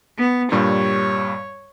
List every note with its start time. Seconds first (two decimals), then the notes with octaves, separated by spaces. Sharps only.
0.18 B3
0.52 G2 A#2 G3 C#5